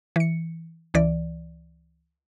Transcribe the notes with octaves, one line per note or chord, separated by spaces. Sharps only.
E3 C#7
C#2 E3 D5